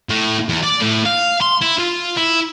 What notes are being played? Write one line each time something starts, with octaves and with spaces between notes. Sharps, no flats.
A2
E2
D5
A2
F5
C6
E4
F4
E4